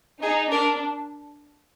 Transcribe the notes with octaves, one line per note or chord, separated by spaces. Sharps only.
D#4 G#4
D4 A#4